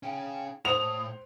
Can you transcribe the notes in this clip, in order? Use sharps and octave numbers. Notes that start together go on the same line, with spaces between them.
C#4 G#4 G5
A2 C5 D#6 F7